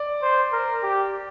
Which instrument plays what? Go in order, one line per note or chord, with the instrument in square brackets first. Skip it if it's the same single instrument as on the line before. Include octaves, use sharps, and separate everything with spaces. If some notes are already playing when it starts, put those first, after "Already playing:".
Already playing: [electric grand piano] D5
[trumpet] C5
A#4
G4